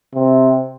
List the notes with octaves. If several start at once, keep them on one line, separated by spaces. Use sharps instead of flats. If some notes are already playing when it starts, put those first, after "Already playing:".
C3